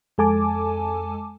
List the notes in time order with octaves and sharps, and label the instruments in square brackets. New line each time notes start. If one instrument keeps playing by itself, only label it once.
[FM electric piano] F2 G#3 A4 G#5 A5 D6